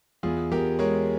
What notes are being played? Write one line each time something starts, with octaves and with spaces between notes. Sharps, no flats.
E2 F4 G#4
E2 G4 A#4
G#3 A#4 C#5